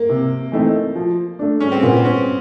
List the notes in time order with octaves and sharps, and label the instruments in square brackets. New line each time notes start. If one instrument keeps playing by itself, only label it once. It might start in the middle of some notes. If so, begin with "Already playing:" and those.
Already playing: [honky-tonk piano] A#3
[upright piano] C3
E3 A3 C4 D#4
F3
A3 D4
[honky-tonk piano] C#4
C4
[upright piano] A#2 [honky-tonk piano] B3
[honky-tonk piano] C4
C#4